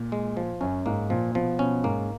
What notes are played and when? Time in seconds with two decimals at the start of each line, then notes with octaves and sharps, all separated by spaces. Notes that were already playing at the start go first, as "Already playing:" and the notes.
Already playing: A#2
0.12 G#3
0.37 F3
0.61 F#2 C#4
0.86 G#2 A#3
1.10 A#2 F3
1.35 B2 F3
1.59 B2 C#4
1.83 G#2 A#3